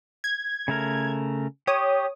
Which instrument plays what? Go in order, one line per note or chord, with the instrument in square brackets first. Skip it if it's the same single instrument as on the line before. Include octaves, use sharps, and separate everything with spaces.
[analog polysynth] G#6
[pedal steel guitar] C#3 A3 A#4
[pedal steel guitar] G4 [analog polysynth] C#5 D#6